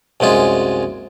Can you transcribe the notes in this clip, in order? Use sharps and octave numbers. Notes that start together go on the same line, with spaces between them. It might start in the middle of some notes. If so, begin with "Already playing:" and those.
C2 F#2 G#3 F4